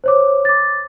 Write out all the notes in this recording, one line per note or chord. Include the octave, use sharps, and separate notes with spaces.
C5 C#5 D6
D6 A6